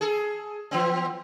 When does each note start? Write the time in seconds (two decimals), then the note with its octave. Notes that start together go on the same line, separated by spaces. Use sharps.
0.01 G#4 A4
0.71 E3 B3 C4